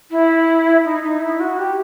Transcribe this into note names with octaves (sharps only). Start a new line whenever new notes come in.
E4
D#4
D#4
E4
F#4
G4